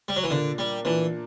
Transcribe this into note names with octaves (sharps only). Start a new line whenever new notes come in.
G3
F#3
E3
A#2 D3 A#3 D4
G3
A#2 E3 A#3 D4